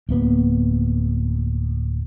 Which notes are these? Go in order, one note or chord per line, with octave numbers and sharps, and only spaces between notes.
D1 A#3 B3